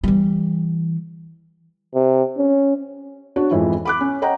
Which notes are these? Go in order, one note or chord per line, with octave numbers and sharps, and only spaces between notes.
E3 G3
C3
C#4
D4 F#4 C#5
F2 G#2 E3 F3 E4
B5 D6 F#6
C#4
C#5 D#5 F#5 G5 A#5